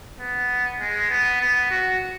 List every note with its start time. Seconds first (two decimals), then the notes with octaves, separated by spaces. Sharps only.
0.21 B3
0.80 G#3
1.10 B3
1.41 B3
1.71 F#4